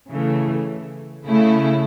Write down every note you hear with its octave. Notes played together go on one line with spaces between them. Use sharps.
C#3 E3 A3
C#3 A3 E4